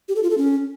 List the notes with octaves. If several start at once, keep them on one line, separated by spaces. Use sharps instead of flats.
G4
A4
F4
A4
C#4